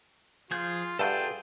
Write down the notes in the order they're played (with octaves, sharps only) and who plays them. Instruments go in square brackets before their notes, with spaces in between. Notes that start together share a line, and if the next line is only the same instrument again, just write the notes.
[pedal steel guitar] F3 G#4 G6 [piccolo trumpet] F4
[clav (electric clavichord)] G2 E5 F#5 [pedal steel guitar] F4 G#4 A4 [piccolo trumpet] G5